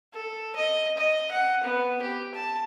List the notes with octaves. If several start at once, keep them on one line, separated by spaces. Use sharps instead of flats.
A4
D#5
D#5
F#5
B3
G4
A5